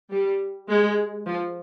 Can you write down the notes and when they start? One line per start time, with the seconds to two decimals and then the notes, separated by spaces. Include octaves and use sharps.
0.11 G3
0.69 G#3
1.27 F3